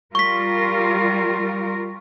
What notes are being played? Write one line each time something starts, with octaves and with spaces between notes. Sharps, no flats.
G3 F4 A#4 C#6 B6